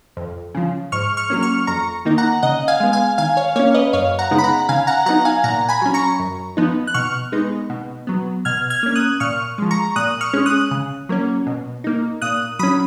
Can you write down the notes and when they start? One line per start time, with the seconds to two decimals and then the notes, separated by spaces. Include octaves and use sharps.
0.17 F2
0.54 C#3 F3
0.92 G#2 C#6 F6
1.17 C#6 F6
1.30 F#3 A#3 C#4
1.42 C#6 F6
1.67 F2 A#5 C#6
2.05 D#3 A#3 D#4
2.18 F#5 A#5
2.43 C#3 D#5 F#5
2.68 F5 G#5
2.80 G#3 B3
2.93 F5 G#5
3.18 D#3 F5 G#5
3.37 C#5 F5
3.56 A#3 C#4 C#5 F5
3.74 B4 D#5
3.93 F#2 C#5 F5
4.19 F#5 A#5
4.31 C#3 G#3 B3 D#4
4.38 B5
4.44 F#5 A#5
4.69 C#3 F5 G#5
4.87 F#5 A#5
5.06 F#3 B3 D#4 F#5 A#5
5.25 F5 G#5
5.44 A#2 F#5 A#5
5.69 G#5 B5
5.82 F#3 C#4
5.94 A#5 C#6
6.19 F#2
6.57 F3 B3 D#4
6.87 F#6
6.94 B2 C#6 F6
7.32 G#3 B3 D#4
7.70 B2
8.07 F#3 B3
8.45 B2 F6 G#6
8.70 F6 G#6
8.83 A#3 C#4
8.95 D#6 F#6
9.20 A#2 C#6 F6
9.58 F3 G#3
9.71 A#5 C#6
9.96 A#2 D#6 F#6
10.21 C#6 F6
10.33 G#3 C#4
10.46 D#6 F#6
10.71 C#3
11.09 F#3 A#3 C#4
11.46 B2
11.84 A#3 D#4
12.22 A#2 D#6 F#6
12.59 F#3 C#4 B5 D#6